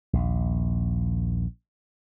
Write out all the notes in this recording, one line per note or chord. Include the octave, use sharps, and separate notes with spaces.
A#1 D#2